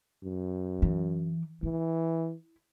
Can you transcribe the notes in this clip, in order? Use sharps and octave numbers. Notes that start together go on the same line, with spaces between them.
F#2
E3
E3 E4